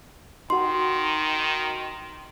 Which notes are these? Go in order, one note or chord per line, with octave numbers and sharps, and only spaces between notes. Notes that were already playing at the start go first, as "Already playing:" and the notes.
D#3 D#4 F#4 C6